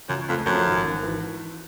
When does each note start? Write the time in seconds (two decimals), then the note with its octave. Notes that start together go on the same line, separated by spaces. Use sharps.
0.09 C#2 F#2
0.29 F2 A3
0.46 F#2 F3
0.66 G#1
0.84 G#1
1.03 E3